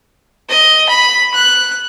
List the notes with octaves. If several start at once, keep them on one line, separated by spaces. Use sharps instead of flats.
D#5
B5
F#6